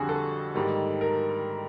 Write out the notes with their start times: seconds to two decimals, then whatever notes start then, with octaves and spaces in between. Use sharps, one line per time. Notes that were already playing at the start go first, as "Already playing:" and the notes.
Already playing: F2 D3 G3 F#4 G#4
0.09 A4
0.55 G#2 D#3 G3 A#3
1.01 A#4